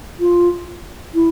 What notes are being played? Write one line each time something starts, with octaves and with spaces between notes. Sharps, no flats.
F4
E4